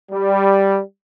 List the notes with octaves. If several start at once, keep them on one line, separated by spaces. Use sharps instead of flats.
G3